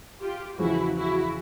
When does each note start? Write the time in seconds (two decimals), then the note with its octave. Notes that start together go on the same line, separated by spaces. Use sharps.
0.20 F4 G4
0.58 E2 C#3 F3 G#3 E4 F#4
0.96 E4 F#4